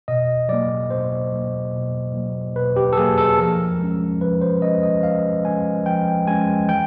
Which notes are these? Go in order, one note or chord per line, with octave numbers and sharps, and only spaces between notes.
B2 D#5
F#3 A#3 D5
B2 C5
F#3 A#3
B2
F#3 A#3
B2 B4
G4
A4
F#3 A#3 G#4
A4
F3 A#4
G#3 C#4
F3 B4
C5
G#3 C#4 D#5
D#5
F3 F5
G#3 C#4 G#5
F3 G5
G#3 C#4 G#5
E3 G5